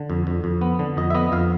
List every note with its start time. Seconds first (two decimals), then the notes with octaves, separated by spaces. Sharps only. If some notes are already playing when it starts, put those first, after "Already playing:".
Already playing: D3
0.10 F2
0.27 F2
0.44 F2
0.61 B3
0.79 D3
0.97 F2 D#5
1.10 E5
1.15 B3 D#5
1.32 F2 F5